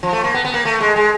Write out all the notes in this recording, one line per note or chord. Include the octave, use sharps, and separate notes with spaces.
F3
A3
A#3
B3
B3
A#3
A3
G#3
G#3